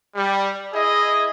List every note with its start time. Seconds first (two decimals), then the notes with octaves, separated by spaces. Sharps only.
0.15 G3
0.74 E4 G#4 D#5